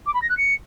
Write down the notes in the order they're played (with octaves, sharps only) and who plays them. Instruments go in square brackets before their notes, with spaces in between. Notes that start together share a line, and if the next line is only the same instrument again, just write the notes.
[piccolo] D6
B5
A#6
F#6
C#7